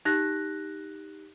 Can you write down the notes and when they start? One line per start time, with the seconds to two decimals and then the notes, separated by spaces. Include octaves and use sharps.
0.05 D#4 G4 F#6 A#6